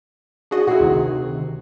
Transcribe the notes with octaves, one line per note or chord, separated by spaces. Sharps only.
D4 F#4 G#4 D#5
A#2 E4 F#4 G#4
D2 C3 D#3